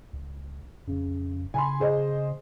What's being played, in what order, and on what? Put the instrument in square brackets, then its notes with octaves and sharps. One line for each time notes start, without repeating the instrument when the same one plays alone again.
[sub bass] C#2
[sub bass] F2 [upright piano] C#3
[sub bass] C#3 [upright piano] G#5 B5 C6
[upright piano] G#4 C5 D#5